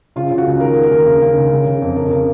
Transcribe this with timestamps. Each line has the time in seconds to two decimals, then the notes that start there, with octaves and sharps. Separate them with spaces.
0.16 C#3 F4
0.31 C#3
0.38 F#4
0.47 C#2
0.60 D#3 A#4
0.75 D#3
0.83 A#4
0.91 D#2
1.06 C#3
1.22 C#3
1.36 C#2
1.51 C#3
1.66 C#3
1.82 F2
1.97 C#3 A#4
2.11 C#3